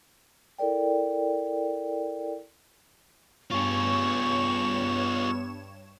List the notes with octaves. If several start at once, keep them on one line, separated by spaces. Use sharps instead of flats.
E4 A4 A#4 D5 G5
G2 B3 F4 G#4 C#5 C#6 E7